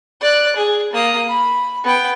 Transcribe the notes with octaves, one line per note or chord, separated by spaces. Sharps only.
D5 F#6
G#4
A#3 D#6
B5
B3 G5